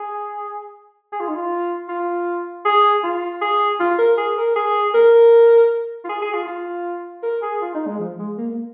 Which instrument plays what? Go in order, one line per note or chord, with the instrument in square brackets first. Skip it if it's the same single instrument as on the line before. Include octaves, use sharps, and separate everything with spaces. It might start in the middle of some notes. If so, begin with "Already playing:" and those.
Already playing: [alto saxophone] G#4
G#4
F4
D#4
F4
F4
G#4
F4
G#4
F4
A#4
G#4
A#4
G#4
A#4
F4
G#4
G#4
F4
F4
A#4
G#4
F4
D#4
G#3
F3
G#3
A#3
A#3